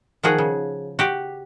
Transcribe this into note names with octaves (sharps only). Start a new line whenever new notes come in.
D#3 F3 F#4 G#4
C#3
F#4 G4